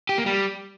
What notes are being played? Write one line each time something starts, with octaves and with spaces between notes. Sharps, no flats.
G4
A#3
G3